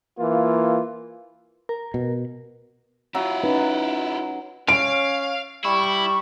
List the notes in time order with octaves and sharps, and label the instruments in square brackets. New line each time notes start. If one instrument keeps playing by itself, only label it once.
[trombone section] E3 A#3 F4
[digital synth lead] A#4
[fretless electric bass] B2
[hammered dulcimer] F#3 [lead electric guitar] E4 F4
[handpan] C#4 D#4 B4
[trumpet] C#4 [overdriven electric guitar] F5 [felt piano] D7
[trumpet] G3 [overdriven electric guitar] E4 [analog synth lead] C#6